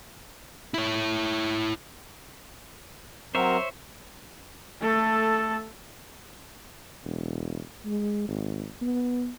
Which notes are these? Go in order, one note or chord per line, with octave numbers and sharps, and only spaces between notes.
E4 C#5
F#3 C4 A#4 C5 C#5 E5
A3 A4
E1
G#3
G#1
B3